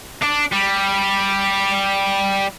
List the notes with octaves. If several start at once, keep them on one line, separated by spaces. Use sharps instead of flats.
D4
G3